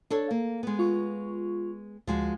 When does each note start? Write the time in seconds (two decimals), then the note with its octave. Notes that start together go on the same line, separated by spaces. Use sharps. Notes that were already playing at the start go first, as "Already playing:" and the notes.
0.10 D4 A4 C#5
0.31 A#3
0.63 G#3 B3
0.79 F4 C#6
2.07 D2 F3 G#3 F#4